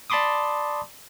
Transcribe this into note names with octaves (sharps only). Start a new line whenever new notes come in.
D5 A5 B5 C6 D6 D#6